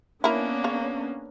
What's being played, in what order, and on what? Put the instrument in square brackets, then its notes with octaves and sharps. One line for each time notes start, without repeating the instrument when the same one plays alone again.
[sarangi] A#3 [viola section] B3 C#4 D4 [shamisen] E4 A#4
[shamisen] C#3 C#5